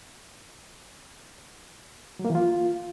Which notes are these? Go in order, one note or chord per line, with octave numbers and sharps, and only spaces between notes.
F#3
A#3
E3
F4